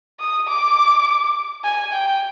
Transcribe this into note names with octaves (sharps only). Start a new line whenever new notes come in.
D#6
D6
G#5
G5